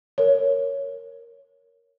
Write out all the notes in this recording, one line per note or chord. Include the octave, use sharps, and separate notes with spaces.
A#4 C#5